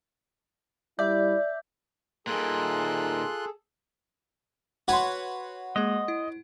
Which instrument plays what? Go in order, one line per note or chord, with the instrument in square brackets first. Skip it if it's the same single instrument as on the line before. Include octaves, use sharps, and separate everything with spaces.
[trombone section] G3 E4 [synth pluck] D5 [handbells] E5 G6
[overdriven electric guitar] A#2 D#3 [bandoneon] F4 C6 F#6 [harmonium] G#4 A4
[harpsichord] F#4 B4 C#5 [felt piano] F#5 C6
[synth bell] G#3 A#3 G#4 [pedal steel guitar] D#5
[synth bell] E4